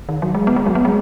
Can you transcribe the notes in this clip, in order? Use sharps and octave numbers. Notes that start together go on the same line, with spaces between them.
D#3
F#3
G#3
B3
G#3
F#3
B3
G#3